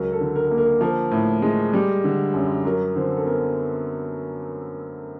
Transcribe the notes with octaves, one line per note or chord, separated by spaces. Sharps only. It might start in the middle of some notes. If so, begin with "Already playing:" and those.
Already playing: C#2 F#3 A#4
A4
D3
A#4
A#3
A#4
F3 A#4
A2
G#3
G3
D3
F#2
F#3 A#4
D3 C4 C5
A4
B3 A#4